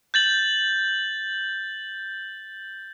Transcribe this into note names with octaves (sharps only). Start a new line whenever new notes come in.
G6 A6 F#7